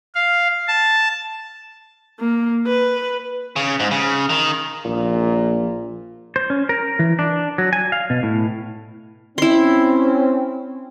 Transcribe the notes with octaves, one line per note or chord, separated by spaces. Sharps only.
F5
A5
A#3
B4
C#3
G#2
C#3
D#3
A#1 A#2
C5
C#4
A#4
E3
D4
F#3
G#5
F5
B2
A2
C4 C#4 E4 C6